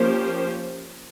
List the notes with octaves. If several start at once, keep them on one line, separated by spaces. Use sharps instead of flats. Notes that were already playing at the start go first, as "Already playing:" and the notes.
Already playing: F3 A#3 C#4 G4 C5